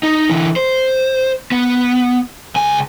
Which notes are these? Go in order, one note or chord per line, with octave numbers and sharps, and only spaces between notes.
D#4
D3 E3
C5
B3
C#2 G#5